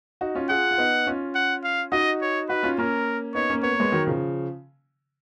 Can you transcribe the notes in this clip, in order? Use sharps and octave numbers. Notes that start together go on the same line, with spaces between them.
D#4 F#4
C#4 F4
F4 G#4 F#5
F4
B3 D#4
C#4 F4
F#5
F5
D#4 F#4 D#5
C#5
D#4 F#4 B4
C#4 F4
A#3 C#4 A#4
B3 D#4 C#5
A#3 C#4
B3 C#5
A#3
G#3 B3
D#3 F#3
C#3 F3